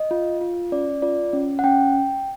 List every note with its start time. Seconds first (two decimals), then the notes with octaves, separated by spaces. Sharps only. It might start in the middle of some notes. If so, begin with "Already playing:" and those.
Already playing: D#5
0.11 F4
0.41 F4
0.72 C#4 D5
1.02 F4 D5
1.33 C#4
1.59 F#5
1.64 C#4 G5